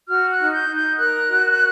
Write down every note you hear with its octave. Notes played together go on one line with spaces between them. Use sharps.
F#4 F6
F#6
D#4
G6
D#4
G6
A#4 F#6
F#4